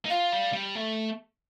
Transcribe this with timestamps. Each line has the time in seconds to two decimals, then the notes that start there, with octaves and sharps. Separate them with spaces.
0.05 D#4
0.10 F4 F5
0.32 G3
0.53 G3
0.75 A3